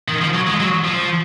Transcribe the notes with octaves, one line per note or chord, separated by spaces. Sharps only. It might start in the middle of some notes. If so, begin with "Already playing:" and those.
D#3
F3
F#3
G#3
F#3
F3